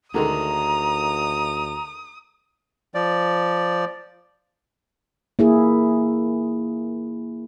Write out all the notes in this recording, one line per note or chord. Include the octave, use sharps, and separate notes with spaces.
D2 D3 D#3 G#3 A#5 D#6
F3 D5
A#3 E4 G#4